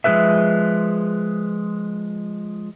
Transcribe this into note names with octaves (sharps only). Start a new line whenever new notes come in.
F3 G#3 E4 A4 B4 E5